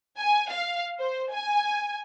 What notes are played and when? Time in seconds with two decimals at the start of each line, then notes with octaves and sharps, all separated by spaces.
0.18 G#5
0.49 F5
0.99 C5
1.31 G#5